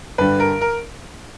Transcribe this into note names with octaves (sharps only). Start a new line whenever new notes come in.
G2 D3 G3 B4
A#4
A#4